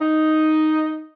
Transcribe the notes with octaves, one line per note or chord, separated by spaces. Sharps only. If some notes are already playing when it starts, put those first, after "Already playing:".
D#4